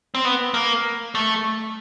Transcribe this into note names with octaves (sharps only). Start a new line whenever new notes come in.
C4
B3
A#3
A3